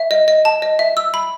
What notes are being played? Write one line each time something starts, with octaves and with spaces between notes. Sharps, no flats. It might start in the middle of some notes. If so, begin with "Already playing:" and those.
Already playing: E5
D#5
D#5
A5
D#5
E5
E6
B5